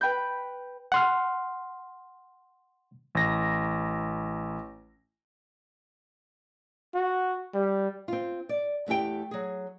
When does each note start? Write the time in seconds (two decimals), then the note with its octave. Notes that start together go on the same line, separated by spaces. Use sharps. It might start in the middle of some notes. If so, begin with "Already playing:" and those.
0.01 B4 G5 B5 G6
0.92 F#5 C6 F6
3.15 A1 A#6
6.95 F#4
7.55 G3
8.08 C4 F4
8.49 D5
8.86 E2 A3 E4 G4 G5
9.31 F#3 G#4